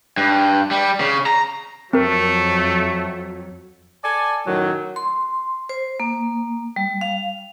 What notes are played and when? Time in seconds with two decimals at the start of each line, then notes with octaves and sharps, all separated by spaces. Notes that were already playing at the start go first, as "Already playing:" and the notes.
0.17 G2
0.71 G3
1.00 C#3
1.26 A#5
1.93 F2 F#3 A3 C4 A#4
4.04 A4 D5 G#5
4.46 F#2 A2 D#3 F#3
4.96 C6
5.69 C5
6.00 A#3
6.76 G3
7.01 F5